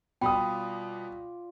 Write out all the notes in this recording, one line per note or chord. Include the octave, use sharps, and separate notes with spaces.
B2 G3 F4 D5 G5 B5 D#6